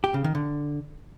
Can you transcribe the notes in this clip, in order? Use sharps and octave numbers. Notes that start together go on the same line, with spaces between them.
G4
C#3
D#3
D3